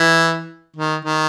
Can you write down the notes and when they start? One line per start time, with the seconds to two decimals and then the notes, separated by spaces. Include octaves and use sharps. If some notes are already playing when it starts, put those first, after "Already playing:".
Already playing: E3
0.76 D#3
1.05 D#3